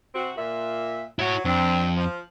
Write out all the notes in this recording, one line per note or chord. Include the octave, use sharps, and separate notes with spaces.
C3 C4 F#4
A#2 E5
F#3 E4 C#5
F2 C4 D4
F3